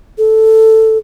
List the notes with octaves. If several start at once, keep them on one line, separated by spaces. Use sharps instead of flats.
A4